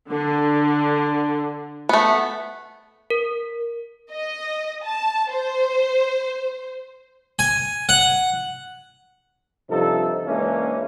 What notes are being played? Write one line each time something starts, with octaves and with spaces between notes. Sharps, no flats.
D3
A3 B3
A#4
D#5
A5
C5
G#5
F#5
G2 C3 F3 D#4 A4
C#2 E3 G#3 A#3 C#4 D4